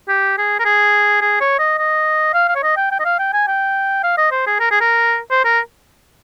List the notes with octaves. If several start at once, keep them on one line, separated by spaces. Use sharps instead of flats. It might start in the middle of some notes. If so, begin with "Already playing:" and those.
G4
G#4
A#4
G#4
G#4
C#5
D#5
D#5
F5
F5
C#5
D#5
G5
G5
D#5
F5
G5
G#5
G5
F5
D#5
C5
G#4
A#4
G#4
A#4
C5
A#4